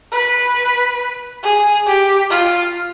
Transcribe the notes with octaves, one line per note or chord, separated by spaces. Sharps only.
B4
G#4
G4
F4